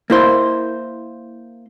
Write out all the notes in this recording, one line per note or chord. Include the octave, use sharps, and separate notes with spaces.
A#3 E4 C5